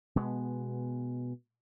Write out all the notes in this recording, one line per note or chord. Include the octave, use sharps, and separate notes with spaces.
B2 G#3 B3